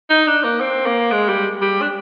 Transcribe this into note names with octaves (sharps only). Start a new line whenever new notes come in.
D#4
D4
A#3
C4
A#3
G#3
G3
G3
D4